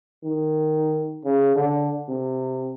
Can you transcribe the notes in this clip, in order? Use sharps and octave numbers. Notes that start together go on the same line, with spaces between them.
D#3
C#3
D3
C3